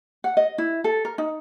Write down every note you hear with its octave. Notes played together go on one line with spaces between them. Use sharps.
F#5
D#5
E4
A4
A#4
D#4